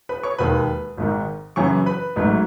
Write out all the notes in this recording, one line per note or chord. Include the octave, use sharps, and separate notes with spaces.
B4 B5
C#5 C#6
E1 D#2 D#3 B4 B5
G#1 G#2 D#3
F#2 C#3 E3 C#5 C#6
B4 B5
A1 G#2 F#3 A3